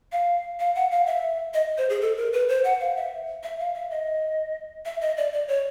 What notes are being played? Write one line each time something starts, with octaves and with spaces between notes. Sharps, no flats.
F5
F5
F#5
F5
E5
D#5
C5
G#4
A4
A#4
B4
C5
F#5
F5
E5
E5
F5
E5
D#5
E5
D#5
D5
D5
C#5